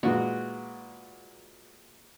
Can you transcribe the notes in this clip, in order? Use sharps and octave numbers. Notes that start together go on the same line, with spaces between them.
A#2 E3 G#3 F#4